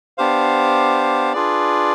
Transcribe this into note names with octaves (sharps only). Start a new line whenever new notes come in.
B3 D4 G4 C5 F5
D4 F4 G#4 B4 D5